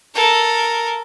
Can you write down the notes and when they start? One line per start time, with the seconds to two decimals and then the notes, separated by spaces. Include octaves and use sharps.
0.15 A4 A#4